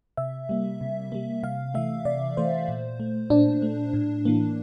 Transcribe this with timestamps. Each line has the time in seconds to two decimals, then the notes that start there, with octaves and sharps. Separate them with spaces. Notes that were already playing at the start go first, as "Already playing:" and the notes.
0.17 C3 E5
0.49 G3 A#3
0.81 C3
1.12 G3 A#3
1.43 C3 F5
1.74 E3 A3 E5
2.05 C3 D5
2.37 E3 A3 C5
2.68 A#2
3.00 A3
3.30 A#2 D4
3.62 A3
3.93 A2
4.25 E3 A#3